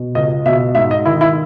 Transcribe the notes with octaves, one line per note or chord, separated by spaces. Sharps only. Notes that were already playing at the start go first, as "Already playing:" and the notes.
Already playing: B2
C#2 D#5
B2 E5
G#2 E5
D#5
D#3 E4
E4